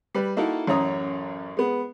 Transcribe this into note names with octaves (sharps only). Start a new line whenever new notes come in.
G3 B4
A#3 D#4 E4 F#4 A4 A#4
A1 F#2 C#5 A#5 D#6
G#3 B3